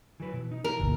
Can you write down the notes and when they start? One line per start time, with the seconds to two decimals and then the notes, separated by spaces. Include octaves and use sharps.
0.20 E3 F#3 B4
0.33 B2
0.52 D#4
0.64 E3 A#4
0.80 G1 D2 A#2